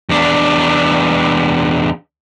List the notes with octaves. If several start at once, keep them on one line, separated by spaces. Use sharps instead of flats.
E2 D4